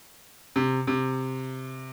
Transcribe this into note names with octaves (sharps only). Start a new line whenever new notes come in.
C3
C3